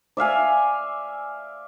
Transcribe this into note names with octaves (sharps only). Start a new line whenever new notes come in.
D5 E5 F5 G#5